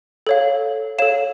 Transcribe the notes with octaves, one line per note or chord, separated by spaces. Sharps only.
A4 C#5 F5
A4 C#5 F5 E7